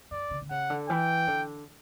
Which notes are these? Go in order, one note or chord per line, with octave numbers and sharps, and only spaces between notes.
F#2 D5
C#3
D3
C#3 F#5
D3
E3 G5
D3